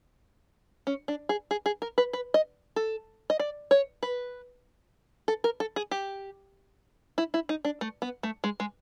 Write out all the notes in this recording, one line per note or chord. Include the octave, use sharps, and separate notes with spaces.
C#4
D4
G#4
G#4
G#4
A#4
B4
B4
D#5
A4
D#5
D5
C#5
B4
A4
A#4
A4
G#4
G4
E4
E4
D#4
D4
A3
B3
A3
G#3
G#3